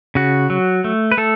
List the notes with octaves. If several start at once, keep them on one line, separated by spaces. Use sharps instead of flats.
C#3 F#4
F#3
A3
B4
A3 A4